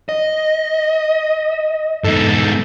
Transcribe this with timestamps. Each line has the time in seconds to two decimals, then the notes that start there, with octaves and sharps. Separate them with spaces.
0.09 D#5
2.04 E2 G#2 A4